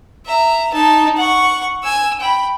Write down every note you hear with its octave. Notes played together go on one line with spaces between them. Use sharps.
E5 A#5
D#4 A5
F#5 C#6
G#5 E6
G5 B5